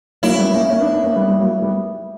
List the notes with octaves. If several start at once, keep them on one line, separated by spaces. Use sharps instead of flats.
F#3 A#3 E4
C#4
G3 B3
A#3 C#4
A#3 C#4
B3 D4
B3 D4
A#3 C#4
G3 B3
G3
F#3 A#3
G3 B3